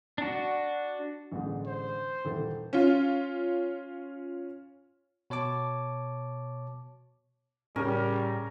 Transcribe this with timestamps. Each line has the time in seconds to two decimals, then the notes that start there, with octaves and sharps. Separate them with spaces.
0.18 D4 F#4
1.32 A1 D3 G#3
1.66 C5
2.25 D#1 E3 A4
2.73 C#4 F4
5.30 B2 C#5 A5 D6
7.76 A2 C#3 G3 C#4 A#4